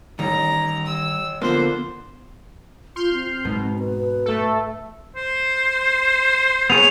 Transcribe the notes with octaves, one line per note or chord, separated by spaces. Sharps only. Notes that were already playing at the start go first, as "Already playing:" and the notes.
A1 D#3 G3 A#5
E6
D3 F3 A#3 B3 C5
F4 C6 F6 G6
C4
G#2 B2
B4
A3 A4
C5
B3 G#4 C#5 F7